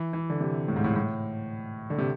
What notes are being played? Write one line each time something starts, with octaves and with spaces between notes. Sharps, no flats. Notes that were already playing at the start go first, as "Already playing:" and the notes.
Already playing: E3
E3
D3
C3
A2
G#2
A2
A2
D3
C3